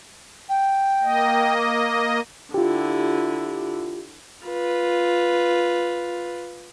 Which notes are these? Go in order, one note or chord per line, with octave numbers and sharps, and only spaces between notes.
G5
A#3 D#5
D6
D3 E4 F4 G4
F4 B4